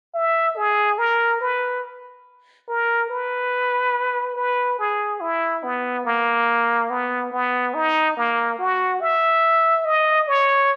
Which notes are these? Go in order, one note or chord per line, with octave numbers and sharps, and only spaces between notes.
E5
G#4
A#4
B4
A#4
B4
B4
G#4
E4
B3
A#3
B3
B3
D#4
A#3
F#4
E5
D#5
C#5